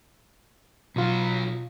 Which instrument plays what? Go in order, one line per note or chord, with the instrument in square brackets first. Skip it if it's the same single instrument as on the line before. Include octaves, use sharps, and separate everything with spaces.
[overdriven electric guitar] B1 F#3 [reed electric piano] B2 F4